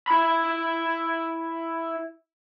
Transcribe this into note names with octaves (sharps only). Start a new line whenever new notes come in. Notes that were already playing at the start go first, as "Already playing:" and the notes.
E4 B5